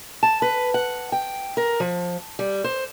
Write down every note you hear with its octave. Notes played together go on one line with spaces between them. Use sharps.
A5
B4
F#5
G5
A#4
F3
G3
C5